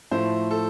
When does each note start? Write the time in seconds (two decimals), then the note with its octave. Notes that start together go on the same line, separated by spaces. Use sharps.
0.11 A2 F3 A3 E4 C5
0.51 A4